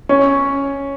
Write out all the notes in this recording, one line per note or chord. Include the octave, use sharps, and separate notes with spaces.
C#4